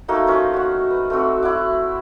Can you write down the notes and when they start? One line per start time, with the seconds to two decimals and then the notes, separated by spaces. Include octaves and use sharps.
0.08 A3 A#3 D#4 F#4
0.27 F3 C#4 C5
0.54 F#4 F#5
0.90 B4
1.10 A3 C4 F#4
1.43 E4 F#5 D6